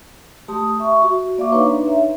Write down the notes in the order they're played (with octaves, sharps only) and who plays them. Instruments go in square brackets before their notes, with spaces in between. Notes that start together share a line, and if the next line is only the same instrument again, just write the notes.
[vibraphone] A3 G4 A5 C6 D#6
E5 C#6
F#4
A#3 D5 E5 F5 C#6 D6
D4 D#4 B4 C#5 A#5 C6
E5